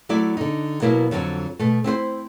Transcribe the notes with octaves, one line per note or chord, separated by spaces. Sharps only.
F#3 A3 E4 D5
D3 D#4
B2 F#3 A#3 B3 E4
F2 D3 E3 F#3
B2 A3
C4 E4 G#4 C5